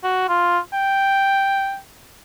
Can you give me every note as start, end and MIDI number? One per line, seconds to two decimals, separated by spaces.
0.04 0.25 66
0.29 0.59 65
0.73 1.78 79